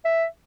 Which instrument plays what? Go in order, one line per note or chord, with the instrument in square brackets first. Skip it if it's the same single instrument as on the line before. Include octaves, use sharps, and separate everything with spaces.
[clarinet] E5